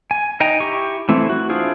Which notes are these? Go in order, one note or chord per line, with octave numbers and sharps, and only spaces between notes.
G#5
D#4 D#5 G5 G#5 A#5
E4 G4 C#6
E3 A3 C4 E4
F#4
D4 E4 F4 G#4 C5